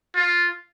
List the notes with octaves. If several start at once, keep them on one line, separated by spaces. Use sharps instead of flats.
F4